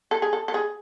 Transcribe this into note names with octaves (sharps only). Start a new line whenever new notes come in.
A4
G#4
A4
A4
G#4